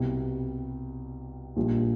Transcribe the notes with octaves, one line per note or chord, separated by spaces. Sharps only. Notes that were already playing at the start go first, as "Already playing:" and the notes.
Already playing: C2 B2 G3
A#1 A#2 G3